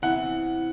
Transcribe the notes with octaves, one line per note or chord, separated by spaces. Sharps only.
C3 E3 B3 E4 F#5